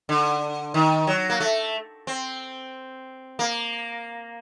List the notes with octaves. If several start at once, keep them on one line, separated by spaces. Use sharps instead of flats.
D3
D#3
F#3
A#3
A3
C4
A#3